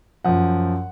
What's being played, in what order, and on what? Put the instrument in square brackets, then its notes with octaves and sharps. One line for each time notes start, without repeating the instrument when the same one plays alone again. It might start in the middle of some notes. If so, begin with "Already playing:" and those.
[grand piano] F#2 F3 F#5